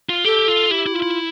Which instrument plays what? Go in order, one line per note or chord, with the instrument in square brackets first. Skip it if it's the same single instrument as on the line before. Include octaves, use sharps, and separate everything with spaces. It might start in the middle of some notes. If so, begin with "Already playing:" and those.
[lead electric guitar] F4
[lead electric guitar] G4 [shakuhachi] A4
[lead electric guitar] F4
[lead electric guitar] E4 [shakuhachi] G4
[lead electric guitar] E4
[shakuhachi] F4
[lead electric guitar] E4